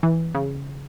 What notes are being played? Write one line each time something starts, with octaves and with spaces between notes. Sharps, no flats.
E3
C#3